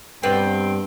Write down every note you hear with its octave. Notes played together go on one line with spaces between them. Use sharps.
G2 B2 C4 B4 D5 G5